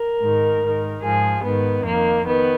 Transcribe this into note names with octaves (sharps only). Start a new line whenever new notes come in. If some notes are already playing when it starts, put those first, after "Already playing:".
Already playing: A#4
G#2 D#3
G#2 D#3
G#2 F3 G#4
G#2 D#3 B3
F2 D#3 A#3
D#3 B3